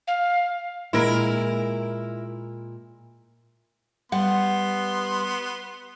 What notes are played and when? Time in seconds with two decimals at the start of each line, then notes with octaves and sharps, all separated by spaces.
0.07 F5
0.93 A#2 G#3 E4 A#4
4.12 G3 B3 F#5 C6